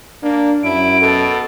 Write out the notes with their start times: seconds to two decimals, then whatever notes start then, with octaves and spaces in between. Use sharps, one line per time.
0.23 A#3 D4
0.64 F#2 E4 D7
1.01 B2 A4